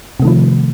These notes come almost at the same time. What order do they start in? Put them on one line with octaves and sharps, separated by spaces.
C3 A3 D#3 F3